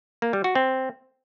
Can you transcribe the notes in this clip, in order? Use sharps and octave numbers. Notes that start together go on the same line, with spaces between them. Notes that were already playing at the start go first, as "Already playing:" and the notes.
A#3
G3
F#4
C4